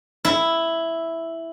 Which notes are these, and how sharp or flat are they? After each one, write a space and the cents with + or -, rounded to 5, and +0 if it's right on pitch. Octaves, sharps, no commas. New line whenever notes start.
E4 +0